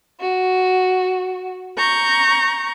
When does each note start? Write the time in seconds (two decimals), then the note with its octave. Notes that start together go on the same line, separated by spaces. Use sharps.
0.20 F#4
1.78 A#5 C#6 G6